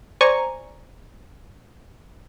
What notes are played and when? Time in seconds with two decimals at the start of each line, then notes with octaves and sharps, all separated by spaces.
0.21 C5 D5 G#5 A#5 C#6